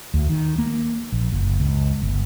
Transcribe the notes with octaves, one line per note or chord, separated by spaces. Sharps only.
D2
D#3
A#3
A#1
F#1
C#2
G1